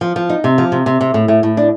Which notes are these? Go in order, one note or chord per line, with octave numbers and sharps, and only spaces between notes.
F3
F3
D#4
C3
F3
C3
C3
C3
A2
A2
A2
D4